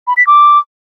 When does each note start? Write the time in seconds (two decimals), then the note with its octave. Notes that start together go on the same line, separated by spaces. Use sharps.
0.07 B5
0.17 B6
0.27 D6